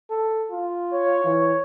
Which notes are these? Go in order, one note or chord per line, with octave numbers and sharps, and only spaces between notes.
A4
F4
C#5
E3